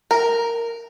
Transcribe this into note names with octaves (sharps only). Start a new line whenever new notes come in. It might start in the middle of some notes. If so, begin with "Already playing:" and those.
A#4